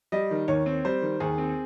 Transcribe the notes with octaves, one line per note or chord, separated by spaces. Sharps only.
G3 D#5
D#3
D#2 C#5
C4
G3 C5
D#3
D#2 G#4
C4